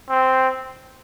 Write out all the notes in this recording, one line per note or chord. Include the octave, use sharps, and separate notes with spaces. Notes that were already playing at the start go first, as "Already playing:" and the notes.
C4